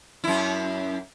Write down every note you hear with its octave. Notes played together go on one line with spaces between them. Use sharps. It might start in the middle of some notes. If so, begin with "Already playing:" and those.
F#2 E4